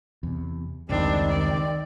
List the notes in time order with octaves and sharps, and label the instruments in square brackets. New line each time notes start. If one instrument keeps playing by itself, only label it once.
[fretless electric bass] E2 C3
[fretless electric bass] F1 C#2 [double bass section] D#3 [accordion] G3 C4 [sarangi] D4
[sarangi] D5